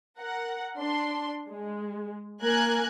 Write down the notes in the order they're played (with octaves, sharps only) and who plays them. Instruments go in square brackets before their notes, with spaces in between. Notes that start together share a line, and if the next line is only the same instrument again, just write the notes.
[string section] A#4 F#5
D4 C6
G#3
A#3 A#4 G#5 F#6 G#6